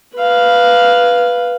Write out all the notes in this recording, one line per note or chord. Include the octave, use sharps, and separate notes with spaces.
B4 F5